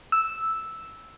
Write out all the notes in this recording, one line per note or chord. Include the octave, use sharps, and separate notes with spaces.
E6